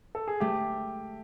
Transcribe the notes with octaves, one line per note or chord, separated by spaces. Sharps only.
A4
G#4
A3 G4